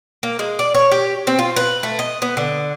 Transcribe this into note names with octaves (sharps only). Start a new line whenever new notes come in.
A#3
G#3
D5
C#5
G4
C4
F4
B4
A3
D#5
B3
D3